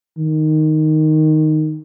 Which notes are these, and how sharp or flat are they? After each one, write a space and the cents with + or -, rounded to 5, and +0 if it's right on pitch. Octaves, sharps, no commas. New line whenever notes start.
D#3 -5